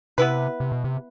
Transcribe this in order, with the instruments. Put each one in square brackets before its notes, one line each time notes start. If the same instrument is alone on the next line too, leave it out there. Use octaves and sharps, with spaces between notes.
[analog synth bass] C3 [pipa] B3 E4 B4
[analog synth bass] C3
B2
C3